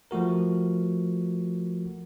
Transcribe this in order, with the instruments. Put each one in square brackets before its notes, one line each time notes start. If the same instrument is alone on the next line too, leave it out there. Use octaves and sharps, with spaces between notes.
[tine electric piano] F3 A3 F#4 A#4